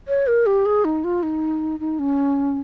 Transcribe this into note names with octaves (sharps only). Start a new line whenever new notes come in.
C#5
A#4
G4
G#4
D#4
F4
D#4
D#4
C#4